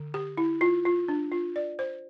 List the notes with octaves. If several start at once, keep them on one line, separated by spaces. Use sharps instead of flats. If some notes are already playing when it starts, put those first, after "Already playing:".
Already playing: D3
G4
E4
F4
F4
D4
F4
D5
C5